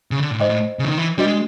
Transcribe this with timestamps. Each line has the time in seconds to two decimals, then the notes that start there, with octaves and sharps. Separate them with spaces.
0.11 C#3
0.20 D3
0.31 A2
0.40 G#2 C5 D#5 G5
0.49 A2
0.79 C#3
0.84 E3
0.88 D#3
0.98 E3
1.18 G3 D4 F#4 B4 D#5
1.27 G#3